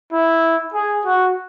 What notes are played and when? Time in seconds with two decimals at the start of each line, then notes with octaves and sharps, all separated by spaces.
0.12 E4
0.74 G#4
1.06 F#4